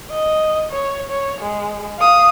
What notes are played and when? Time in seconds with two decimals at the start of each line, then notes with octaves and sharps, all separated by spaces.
0.11 D#5
0.71 C#5
1.10 C#5
1.41 G#3
1.99 F5 D#6